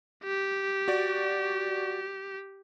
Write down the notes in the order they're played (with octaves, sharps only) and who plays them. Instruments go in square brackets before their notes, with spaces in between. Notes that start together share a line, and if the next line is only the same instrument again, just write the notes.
[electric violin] G4
[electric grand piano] F#4 D5